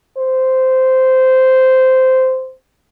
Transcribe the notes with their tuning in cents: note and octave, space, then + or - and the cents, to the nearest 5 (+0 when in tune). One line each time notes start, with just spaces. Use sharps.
C5 -10